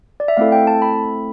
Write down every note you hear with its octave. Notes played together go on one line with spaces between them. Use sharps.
D5
E5
A3 C4 E4 A4 F5
G5
A5
B5